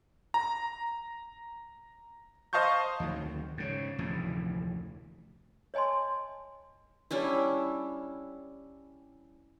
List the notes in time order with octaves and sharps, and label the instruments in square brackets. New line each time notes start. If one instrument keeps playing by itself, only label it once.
[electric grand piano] A#5
C5 D#5 F5 A5 C#6 G6
[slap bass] D2 D#3 F#3
G#2 C#3
F1 D2 A2 E3
[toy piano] C#5 D#5 G#5 A5 C6
[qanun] G3 C#4 D4 E4